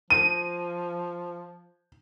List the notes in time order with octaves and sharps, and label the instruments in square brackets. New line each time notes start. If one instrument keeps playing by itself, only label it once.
[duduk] F3 [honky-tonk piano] D#7